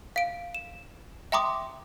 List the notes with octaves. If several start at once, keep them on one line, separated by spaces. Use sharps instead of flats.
F5 D7
E7
E5 G5 A#5 C6 D6 D#6